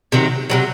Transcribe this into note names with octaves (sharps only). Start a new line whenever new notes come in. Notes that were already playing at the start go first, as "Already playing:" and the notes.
C3 D#3 F#3
C3 D#3 F#3